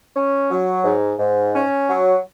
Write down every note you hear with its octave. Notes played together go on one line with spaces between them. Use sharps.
C#4
F#3
G#2
G#2
C#4
F#3